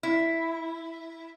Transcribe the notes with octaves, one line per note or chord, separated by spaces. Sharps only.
E4